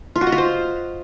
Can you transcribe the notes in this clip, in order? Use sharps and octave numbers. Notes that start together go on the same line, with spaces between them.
F4
F#4
D#5
F4
C5